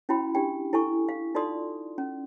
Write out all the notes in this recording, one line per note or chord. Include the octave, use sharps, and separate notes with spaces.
C#4 E4 F#4 G5 B5
D4 G4 G5
E4 A4 G#5 C#6
F5
D#4 F4 A4 D5 C6 D#6
C#4